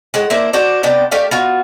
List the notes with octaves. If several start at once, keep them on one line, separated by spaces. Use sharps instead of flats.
A2 G#3 F#5
A#3 D4 E4 C5
D4 F#4 C5 D5
C3 B3 D4 G5
A3 D4 G4 F5
B3 F4 F#4